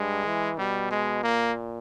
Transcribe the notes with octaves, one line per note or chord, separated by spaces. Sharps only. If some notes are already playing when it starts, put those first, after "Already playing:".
Already playing: G2 G#3
E3
B2 G3
G#3
A#2 A#3